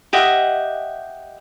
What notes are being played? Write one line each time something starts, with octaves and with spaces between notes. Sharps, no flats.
G4 D#5 E5 F#5